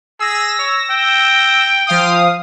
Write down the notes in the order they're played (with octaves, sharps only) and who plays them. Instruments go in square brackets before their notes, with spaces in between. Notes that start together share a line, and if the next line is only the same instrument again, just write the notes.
[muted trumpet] G#4 [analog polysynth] E6 A#6
[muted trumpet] C#5
G5
[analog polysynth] F3 F5 D#6